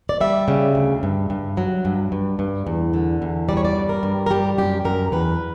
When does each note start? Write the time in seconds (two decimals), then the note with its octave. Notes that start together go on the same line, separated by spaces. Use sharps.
0.09 D5
0.21 G3 E5
0.48 C#3
0.75 D2
1.03 G2
1.30 G2
1.57 F#3
1.85 G2
2.12 G2
2.39 G2
2.67 E2
2.94 D3
3.22 E2
3.49 G3 D5
3.57 C#5
3.65 D5
3.76 G2
3.89 A#4
4.03 G2
4.26 A#4
4.30 G3 G4
4.58 F#2 G4
4.85 F#2 A#4
5.12 E2 B4